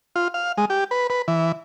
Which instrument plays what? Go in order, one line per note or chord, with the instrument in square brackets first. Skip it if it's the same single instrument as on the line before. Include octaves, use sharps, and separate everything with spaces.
[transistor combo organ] F4
F5
G#3
G4
B4
B4
E3